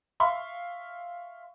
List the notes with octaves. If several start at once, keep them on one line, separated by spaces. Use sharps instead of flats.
E5 F5 C6 C#6